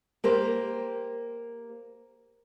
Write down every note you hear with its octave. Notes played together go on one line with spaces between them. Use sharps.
A#3 G4 A#4 C5